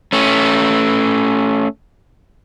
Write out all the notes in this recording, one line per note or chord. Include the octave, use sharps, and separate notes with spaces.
A3 C#4